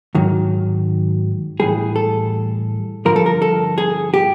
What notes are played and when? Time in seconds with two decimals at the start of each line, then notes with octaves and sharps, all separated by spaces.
0.15 G#2 D#3 F#3
1.60 A2 E3 G3 G#4
1.96 A4
3.05 G2 D3 F3 A#4
3.16 A4
3.26 A#4
3.42 A4
3.78 G#4
4.14 G4